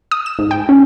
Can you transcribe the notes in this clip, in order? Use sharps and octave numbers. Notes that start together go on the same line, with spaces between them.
D#6
E7
G#2
G5
C#4